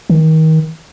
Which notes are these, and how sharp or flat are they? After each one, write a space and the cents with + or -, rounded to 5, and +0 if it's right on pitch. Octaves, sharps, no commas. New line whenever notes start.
D#3 +30